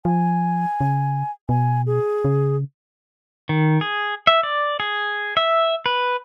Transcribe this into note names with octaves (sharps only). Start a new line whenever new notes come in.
F3 G#5
C#3
B2 G#5
G#4
C#3
D#3
G#4
E5
D5
G#4
E5
B4